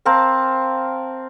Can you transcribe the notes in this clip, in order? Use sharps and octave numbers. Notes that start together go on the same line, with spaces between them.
C4 A#4 F5 A5